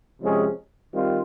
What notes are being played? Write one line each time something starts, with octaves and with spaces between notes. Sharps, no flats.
C3 F3 G#3 C#4 G#4
D#3 G3 C4 F4